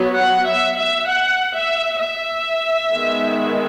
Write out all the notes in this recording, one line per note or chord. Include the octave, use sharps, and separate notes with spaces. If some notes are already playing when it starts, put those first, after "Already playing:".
Already playing: F#3 B3
F#5
E5
E5
F#5
E5
E5
D#3 G#3 B3